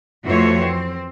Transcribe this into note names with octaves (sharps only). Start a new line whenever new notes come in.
F2 E3 A3 F#4 C5 C#5
C4